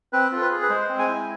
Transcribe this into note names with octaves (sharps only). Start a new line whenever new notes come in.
C4 B4
F4 A4
B4
G#4
B4
G#3 C5
C4
G#5
E4